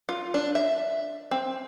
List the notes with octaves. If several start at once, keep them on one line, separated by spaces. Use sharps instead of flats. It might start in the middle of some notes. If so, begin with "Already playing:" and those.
F4
D4
E5
C4